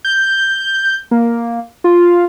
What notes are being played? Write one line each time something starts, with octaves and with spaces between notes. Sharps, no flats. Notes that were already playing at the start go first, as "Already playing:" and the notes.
G6
A#3
F4